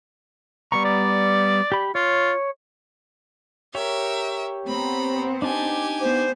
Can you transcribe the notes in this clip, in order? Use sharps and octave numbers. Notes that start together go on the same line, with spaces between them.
G3 B3 A#5 C#6
D5
G4 B5
F4 C#5
G4 A#4 C#5 E5
B3 C4 A#5 B5
D4 D#4 G4 G#5 A5
B3 C5